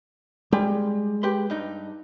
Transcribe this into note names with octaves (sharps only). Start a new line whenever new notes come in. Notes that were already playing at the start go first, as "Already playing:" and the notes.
G3 G#3
G4 B4 C6
G2 D#4